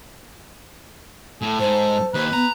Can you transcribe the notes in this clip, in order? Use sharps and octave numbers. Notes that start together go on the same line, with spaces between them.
A2 A4
G#2 C5
D#2 B4
B3 A#5